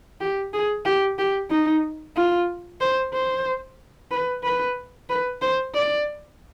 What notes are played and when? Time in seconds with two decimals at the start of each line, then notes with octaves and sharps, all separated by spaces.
0.21 G4
0.53 G#4
0.86 G4
1.19 G4
1.51 D#4
2.16 F4
2.81 C5
3.14 C5
4.11 B4
4.44 B4
5.10 B4
5.42 C5
5.74 D5